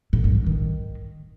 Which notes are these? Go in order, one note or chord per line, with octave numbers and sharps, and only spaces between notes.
A2
G2
G#2
D#3